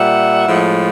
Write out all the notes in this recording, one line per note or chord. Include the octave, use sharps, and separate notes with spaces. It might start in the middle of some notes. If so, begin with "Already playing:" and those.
Already playing: A#2 G3 E5 F#5
A2 F3 G#3